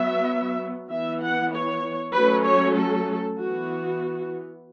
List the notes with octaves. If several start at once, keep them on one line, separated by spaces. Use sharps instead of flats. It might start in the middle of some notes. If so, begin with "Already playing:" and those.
Already playing: F#3 B3 E5
E3 B3 E5
F#5
C#5
F#3 A3 C#4 B4
C#5
A4
E3 B3 F#4